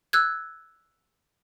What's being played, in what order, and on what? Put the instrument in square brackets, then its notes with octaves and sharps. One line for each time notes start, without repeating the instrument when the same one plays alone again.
[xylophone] E6 F#6 G#6